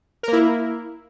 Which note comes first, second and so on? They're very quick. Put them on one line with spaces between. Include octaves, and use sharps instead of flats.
A#4 A#3 E4